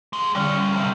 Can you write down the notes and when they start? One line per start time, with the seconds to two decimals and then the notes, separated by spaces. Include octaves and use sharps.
0.13 D#2 G#3
0.35 F2 D3 G3 C#4
0.56 G3
0.73 B1 C3